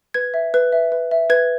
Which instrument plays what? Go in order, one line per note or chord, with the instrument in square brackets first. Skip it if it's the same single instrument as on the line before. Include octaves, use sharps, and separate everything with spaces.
[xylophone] B4 G#6
E5
B4
E5
B4
E5
B4 G#6